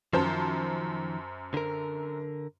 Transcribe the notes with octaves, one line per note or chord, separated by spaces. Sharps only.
F#2 D#3 F3 C5 A5
D3 A#4